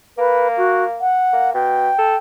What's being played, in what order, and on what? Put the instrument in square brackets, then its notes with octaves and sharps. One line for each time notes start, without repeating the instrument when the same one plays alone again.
[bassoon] A#3 [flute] B4
[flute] F#4
F#5
[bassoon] A#3
[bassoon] B2 [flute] G5
[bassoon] A4